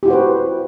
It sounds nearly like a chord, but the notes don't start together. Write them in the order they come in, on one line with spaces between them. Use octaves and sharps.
G4 E4 F#4 C5 B4